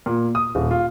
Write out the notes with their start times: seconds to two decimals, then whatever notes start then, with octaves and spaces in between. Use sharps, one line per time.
0.06 A#2
0.35 D#6
0.55 D#1
0.71 F4